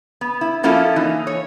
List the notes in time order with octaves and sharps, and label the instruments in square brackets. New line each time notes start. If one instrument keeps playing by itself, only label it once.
[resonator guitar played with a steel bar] B3
E4
F3 A#3 C#4 E4 F4 A4
E3 D#4
C#5